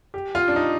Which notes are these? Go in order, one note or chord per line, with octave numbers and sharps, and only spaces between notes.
G4
F4
D4
D#4